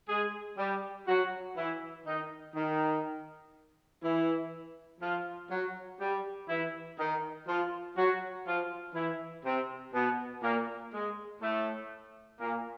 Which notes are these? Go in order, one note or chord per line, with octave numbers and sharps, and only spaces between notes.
G#3 G#4
G3 G4
F#3 F#4
E3 E4
D#3 D#4
D#3 D#4
E3 E4
F3 F4
F#3 F#4
G3 G4
E3 E4
D#3 D#4
F3 F4
F#3 F#4
F3 F4
E3 E4
C3 C4
B2 B3
A#2 A#3
G#3
A2 A3
A#2 A#3